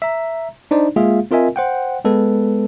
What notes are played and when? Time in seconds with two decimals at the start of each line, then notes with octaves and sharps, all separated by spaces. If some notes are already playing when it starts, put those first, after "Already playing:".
0.02 E5 A#5
0.71 D4 D#4 C5 D5
0.96 G#3 A#3 F4 G#4 E5 F5
1.31 C4 F4 A#4 D#5 E5 G#5
1.56 C5 F#5 G5
2.05 G#3 B3 A4 B4